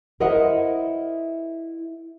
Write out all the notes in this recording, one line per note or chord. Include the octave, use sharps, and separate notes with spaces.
E4 A#4 C5 D#5 E5 F#5